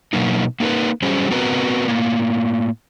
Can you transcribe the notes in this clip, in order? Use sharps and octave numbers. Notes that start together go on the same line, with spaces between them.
B2 F#3 A#3 D#4
A#3 D#4 F#4 A#4 B4
F#3 G3 C#4 G#4 C5
B3 C4 F#4 A#4 B4 A#5
A2 A#3